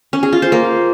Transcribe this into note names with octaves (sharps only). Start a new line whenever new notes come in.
C#4
G#4
F4
C5
A#3